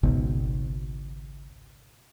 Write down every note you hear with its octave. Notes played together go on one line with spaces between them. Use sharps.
G#1 C#2 B2